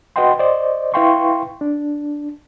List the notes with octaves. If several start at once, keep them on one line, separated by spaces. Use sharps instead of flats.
F#4 B4 D#5 F#5 G5 C6
C5 D5 D#5
E4 B4 F5 G5 C6 C#6
D4